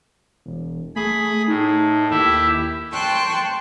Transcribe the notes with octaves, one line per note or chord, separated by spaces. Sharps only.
E1
A3 G#4 B5
A2 D#4
D#2 E4 G4 E5
G5 A5 C6 C#6 F#6